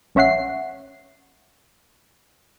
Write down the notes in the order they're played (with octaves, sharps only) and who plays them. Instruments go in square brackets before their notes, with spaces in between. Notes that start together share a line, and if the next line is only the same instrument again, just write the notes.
[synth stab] A#1 C#4 C#5 E5 F#5 C7